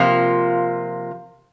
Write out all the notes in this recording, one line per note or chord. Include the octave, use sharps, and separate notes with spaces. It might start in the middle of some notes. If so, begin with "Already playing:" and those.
Already playing: C3 F3 A#3 F4